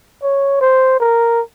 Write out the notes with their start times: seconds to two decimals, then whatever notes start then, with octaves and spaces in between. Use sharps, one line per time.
0.23 C#5
0.61 C5
1.00 A#4